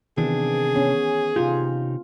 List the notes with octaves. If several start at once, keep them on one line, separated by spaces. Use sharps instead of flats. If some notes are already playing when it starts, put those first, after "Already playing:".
C3 D#3 E3 B3 D4 G#4
B3 C#4
C3 D#4 F4 G4